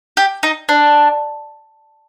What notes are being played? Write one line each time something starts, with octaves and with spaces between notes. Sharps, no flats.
G4
D#4
D4